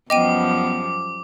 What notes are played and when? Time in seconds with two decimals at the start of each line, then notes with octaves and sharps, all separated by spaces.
0.10 F#2 F3 G3 B3 D#5 G5 D6 D#7